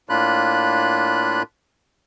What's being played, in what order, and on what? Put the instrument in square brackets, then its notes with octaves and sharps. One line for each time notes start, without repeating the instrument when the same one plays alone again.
[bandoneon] A2 A#3 D4 F4 B5 F#6